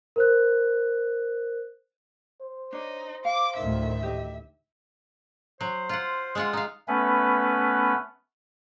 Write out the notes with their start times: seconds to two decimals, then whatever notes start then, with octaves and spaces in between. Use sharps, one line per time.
0.16 A#4 C5 F#6
2.41 C5
2.73 D4 D#4 C#5
3.25 F5 D6
3.56 D2 A2 D#3 E5
4.03 G4 D#5
5.61 F#3 C5
5.89 F4 F#5
6.35 G#3 F4 F#5
6.53 D#4 F5
6.88 A3 B3 C#4 B4